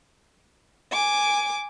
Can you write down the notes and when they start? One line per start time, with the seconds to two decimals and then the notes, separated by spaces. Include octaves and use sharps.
0.92 G#5 D6